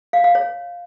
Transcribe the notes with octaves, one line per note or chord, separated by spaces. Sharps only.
F5
F5
C#5